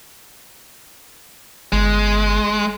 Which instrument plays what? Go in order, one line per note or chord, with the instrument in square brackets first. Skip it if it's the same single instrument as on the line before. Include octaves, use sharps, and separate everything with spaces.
[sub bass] G1 [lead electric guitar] G#3